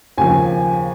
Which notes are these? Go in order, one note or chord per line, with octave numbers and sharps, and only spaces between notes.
D#2 C#3 F3 G#5